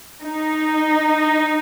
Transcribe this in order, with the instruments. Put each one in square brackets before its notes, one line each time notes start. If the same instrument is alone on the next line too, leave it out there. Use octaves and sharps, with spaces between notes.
[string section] D#4